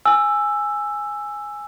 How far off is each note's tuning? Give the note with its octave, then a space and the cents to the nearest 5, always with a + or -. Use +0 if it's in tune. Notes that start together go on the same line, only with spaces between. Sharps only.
G#5 +0 E6 +5